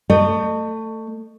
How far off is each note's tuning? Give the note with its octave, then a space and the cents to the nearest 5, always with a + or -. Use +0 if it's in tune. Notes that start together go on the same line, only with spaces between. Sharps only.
A3 +20 D#5 -30